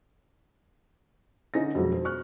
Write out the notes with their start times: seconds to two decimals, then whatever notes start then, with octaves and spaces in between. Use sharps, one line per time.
1.54 D3 C#4 D#4 G#5 A#6
1.75 F2 B2 F#3 G#3
1.93 C5
2.05 C#6 F6 F#6